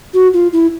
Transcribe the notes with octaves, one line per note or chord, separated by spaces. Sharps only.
F#4
F4
E4